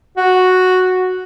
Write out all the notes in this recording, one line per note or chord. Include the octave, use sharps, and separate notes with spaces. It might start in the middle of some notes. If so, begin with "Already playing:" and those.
F#4